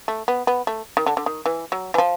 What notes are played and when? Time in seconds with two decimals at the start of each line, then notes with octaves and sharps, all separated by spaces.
0.08 A3
0.28 B3
0.47 B3
0.67 A3
0.97 D#3
1.06 D3
1.17 D3
1.26 D#3
1.46 E3
1.72 F#3
1.94 E3
1.98 F3